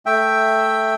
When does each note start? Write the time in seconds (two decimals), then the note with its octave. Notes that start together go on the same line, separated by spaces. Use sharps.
0.06 A3 E5 G5